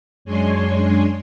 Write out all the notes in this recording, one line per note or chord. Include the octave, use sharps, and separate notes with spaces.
F#2 G#3 D4 C#5 G#5 C6